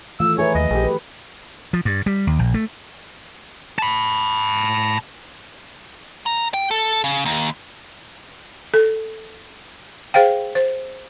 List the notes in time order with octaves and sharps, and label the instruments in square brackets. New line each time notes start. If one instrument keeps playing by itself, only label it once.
[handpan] D#3 E3 A3 [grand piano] F4 [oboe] E6
[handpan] G#4 A#4 B4 [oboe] C#5 [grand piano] E5 G#5
[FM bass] D#2 [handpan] F#3 [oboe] D#5
[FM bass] A#1 [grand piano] G4 G#4
[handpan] B4
[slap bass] F3
G2
G3
D#2
A#1
A3
[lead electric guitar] A5 B5
A#5
G5
A4
C#3
D#2
[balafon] A4
G#4 C5 F5 G5
C5